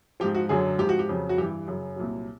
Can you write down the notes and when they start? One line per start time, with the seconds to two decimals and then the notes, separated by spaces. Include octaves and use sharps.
0.20 F3 G4
0.24 G#2
0.35 F#4
0.49 F#2 D3 F#3 G#4
0.79 G#2 F3 G4
0.89 F#4
0.99 G4
1.09 F2 C#3 F#3
1.29 F#4
1.38 G2 G4
1.41 E3
1.68 F#2 C#3 F#3
1.96 C2 A#2 F#3